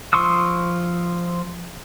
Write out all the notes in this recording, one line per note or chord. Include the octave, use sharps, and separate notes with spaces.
F3 C6 C#6 D#6 E6